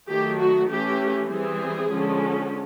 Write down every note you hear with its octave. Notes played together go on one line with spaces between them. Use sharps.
D#3 F#3 A3 G4
F#4
E3 A3 C#4 G4
E3 G3 C4 G#4
D3 F3 G#3 C#4